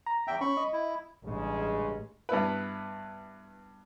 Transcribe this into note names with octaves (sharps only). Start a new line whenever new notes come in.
A#5
E2 E5 G5
C#4 B5 C#6
D#5
E4
A1 G2 C#3 G#3
G2 B3 E4 B4